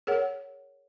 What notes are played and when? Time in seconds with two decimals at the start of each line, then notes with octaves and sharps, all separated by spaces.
0.07 G#4 A#4 C#5 F#5